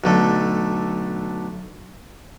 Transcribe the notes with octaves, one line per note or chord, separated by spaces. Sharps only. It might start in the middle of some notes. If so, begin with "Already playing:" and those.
B1 D3 A3